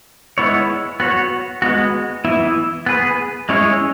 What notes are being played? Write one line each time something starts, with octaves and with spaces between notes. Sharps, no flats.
G#3 B3 E4 C#5
B3 F#4 C#5
G#3 B3 F#4
E3 B3 E4
B3 G#4 B4
G#3 C#4 E4 G#4 C#5